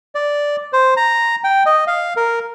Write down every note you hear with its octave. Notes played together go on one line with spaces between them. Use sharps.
D5
C5
A#5
G5
D#5
F5
A#4